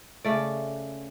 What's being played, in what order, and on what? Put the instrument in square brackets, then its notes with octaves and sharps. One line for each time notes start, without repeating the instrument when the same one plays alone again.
[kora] C#3 A3 D5